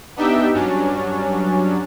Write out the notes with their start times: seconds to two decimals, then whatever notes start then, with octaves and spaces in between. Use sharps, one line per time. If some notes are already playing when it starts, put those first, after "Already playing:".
0.16 B3 D4 D#4 G4 E5 G5
0.53 G2 F#3 C#4 D4